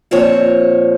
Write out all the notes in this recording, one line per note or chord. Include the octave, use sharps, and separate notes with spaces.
A#2 F3 C4 C#5